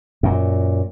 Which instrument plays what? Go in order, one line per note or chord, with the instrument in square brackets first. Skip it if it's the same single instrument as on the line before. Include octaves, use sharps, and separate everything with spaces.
[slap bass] F#2 A#2